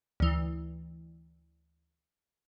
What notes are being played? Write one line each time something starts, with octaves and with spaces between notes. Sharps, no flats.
D2 E3